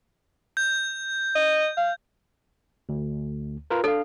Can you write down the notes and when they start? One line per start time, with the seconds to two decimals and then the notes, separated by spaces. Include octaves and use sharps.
0.57 G6
1.36 D#5
1.77 F5
2.89 D2
3.70 F4 A#4 B4
3.84 D4 A4 F5